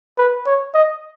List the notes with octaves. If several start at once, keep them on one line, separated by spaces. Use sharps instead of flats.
B4
C#5
D#5